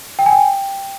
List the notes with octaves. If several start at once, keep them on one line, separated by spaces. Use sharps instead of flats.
G5
G#5
G5